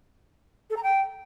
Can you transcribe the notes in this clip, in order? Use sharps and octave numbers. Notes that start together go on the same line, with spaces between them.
A4
A#5
G5